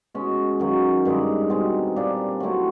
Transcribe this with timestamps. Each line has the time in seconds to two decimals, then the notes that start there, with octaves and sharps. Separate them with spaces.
0.14 B2 G#3 C#4
0.60 F#2 D#3 F#3 A#3
1.05 G2 D#3 G#3
1.50 B2 G#3 C4
1.96 A#2 G3 A#3 D4
2.40 F#3 A3 C4 E4